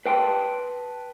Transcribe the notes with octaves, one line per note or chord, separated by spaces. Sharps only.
B4 G5 A5 C6